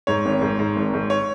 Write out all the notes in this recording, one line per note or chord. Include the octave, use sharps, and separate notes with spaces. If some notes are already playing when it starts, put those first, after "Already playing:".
G#2 C#5
G#1
G#2
G#2
G#1
G#2
C#5